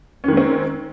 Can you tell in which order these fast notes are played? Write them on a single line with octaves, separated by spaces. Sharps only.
C#4 D#3 G#3 C4